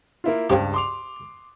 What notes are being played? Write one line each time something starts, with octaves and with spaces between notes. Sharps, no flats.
A#3 E4 F4
C#2 G2 C#3 C4 G4
C6 D6 F7